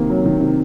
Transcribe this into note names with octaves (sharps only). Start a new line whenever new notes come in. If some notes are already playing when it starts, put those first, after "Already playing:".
Already playing: C3 D#3 A#3
F#3
D#3
C3